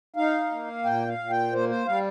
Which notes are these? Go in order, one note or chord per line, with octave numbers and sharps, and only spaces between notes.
D#4 F5
A#3
A#2 G5
F5
A#2
G5
A#3 C5
C5
G3 F5